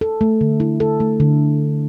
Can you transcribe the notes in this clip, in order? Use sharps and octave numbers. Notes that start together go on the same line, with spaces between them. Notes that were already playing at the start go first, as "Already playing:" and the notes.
A4
A3
D3
E4
A4
A3
D3